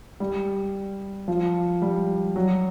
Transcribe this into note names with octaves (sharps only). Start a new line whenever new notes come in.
G3
F3
G3
F#3